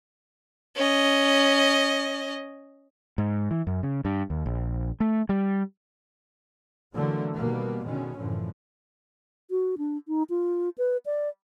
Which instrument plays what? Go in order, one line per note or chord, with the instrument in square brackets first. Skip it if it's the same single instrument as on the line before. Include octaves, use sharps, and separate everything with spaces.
[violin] C#4 D#5
[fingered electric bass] G#2
E3
F#2
C#3
G2
D#2
A#1
A3
G3
[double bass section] B2 D3 E3 F#3 A3 A#3
B2 D#3 G3 A#3 B3
B2 D3 D#3 G#3 C#4
F#2 A2 D3 E3 F3
[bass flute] F#4
D4
D#4
F4
B4
D5